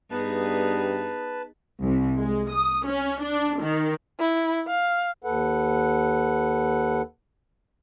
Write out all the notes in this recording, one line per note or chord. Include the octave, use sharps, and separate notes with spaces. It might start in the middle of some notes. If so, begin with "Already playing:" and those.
G2 B3 D#4 G#4 B4 A5
C2
G#3
D#6
C#4
D4
D#3
E4
F5
D#2 A4 B4 F#5